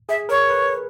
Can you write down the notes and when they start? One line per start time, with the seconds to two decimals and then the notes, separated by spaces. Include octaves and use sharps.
0.09 G#4 E5
0.29 A#4 C#5
0.50 B4